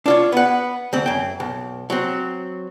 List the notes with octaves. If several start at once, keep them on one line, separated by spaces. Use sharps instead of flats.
D4 F4 C#5
B3 F#5
D2 C4
F#2 G5
B1
F#3 C4